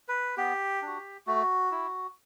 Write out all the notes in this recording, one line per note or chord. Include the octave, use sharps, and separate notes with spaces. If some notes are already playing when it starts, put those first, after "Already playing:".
B4
B3 G4
D4 F#4
A3 F#4
E4